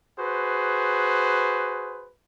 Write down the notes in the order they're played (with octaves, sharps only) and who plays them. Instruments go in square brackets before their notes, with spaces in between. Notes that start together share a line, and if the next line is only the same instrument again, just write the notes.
[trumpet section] F#4 G#4 B4 C5